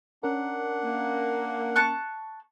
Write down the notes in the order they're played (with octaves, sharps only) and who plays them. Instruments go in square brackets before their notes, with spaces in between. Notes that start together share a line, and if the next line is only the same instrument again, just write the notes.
[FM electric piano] C#4 A#4 [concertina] D4 F#5
[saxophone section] A#3
[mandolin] A5 C#6 F#6